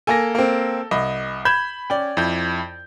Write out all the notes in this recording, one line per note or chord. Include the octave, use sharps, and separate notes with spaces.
A#3 A4 G#5 A#6
A#3 C4
C2 D#5 B5
B5 G6 G#6 E7
C#4 D5 G5
F2 E4 G6